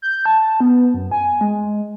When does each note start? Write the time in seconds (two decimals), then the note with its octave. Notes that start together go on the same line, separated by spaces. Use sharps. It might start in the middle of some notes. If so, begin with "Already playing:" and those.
0.02 G6
0.26 A5
0.60 B3
0.94 F#2
1.12 G#5
1.41 G#3